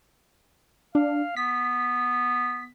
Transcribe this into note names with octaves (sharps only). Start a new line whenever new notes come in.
D4 F5
B3 B6